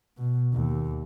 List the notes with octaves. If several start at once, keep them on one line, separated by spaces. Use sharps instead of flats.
B2
D#2